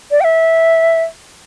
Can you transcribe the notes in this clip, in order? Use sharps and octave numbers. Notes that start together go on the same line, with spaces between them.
D5
G5
E5